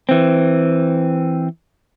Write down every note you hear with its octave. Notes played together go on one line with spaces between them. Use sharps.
E3 C4